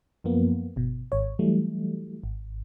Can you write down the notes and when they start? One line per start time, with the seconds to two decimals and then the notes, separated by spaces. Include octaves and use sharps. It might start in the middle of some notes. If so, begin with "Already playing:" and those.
0.24 F#2 F3 A#3 B3
0.76 G1 B2
1.12 G#1 C#5
1.39 E3 F#3 G3 A3
2.24 G#1